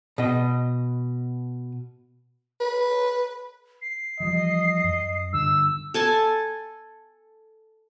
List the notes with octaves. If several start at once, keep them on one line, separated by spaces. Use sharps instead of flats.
B2 D#5
B4
C7
E3 F3 G3 D#5
F#2
G2 D3 E6
A4 G#5 A5